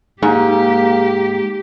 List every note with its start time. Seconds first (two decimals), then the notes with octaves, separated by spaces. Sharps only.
0.23 G#2 G#3 A#3 G4